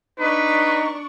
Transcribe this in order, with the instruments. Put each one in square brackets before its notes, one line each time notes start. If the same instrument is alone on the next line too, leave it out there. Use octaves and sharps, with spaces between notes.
[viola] D4 C#6 [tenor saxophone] D#4 [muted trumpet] B4